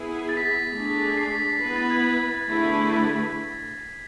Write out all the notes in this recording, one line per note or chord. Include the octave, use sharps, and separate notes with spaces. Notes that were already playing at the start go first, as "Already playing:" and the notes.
Already playing: B3 E4 G#4
A6
B6
A6
A3 D4 G#4
C7
B6
A6
B6
B3 E4 B4 C7
A6
G#6
D3 A3 E4 G#4 B4